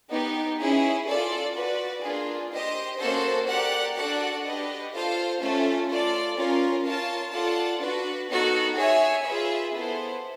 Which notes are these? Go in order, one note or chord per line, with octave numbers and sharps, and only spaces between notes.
B3 D#4 G4
C#4 E4 G#4
F4 A4 D5
F#4 B4 D5
A#3 D4 F4 G#4
G4 C5 D#5
A#3 C#4 F#4 A4 C5
G4 A#4 D5 F#5
D4 F#4 A4 D5 F#5
D4 G4 B4 D#5
F4 A4 C5 F5
A3 C#4 F4 A4
F4 A4 D5
C#4 F4 A#4
F4 A#4 C#5 F5 A5
F4 A4 D5 F#5 A5
D4 F#4 B4
B3 D#4 F#4 A4
G#4 C#5 E5 G#5
F4 G#4 B4 E5
B3 E4 A4 C5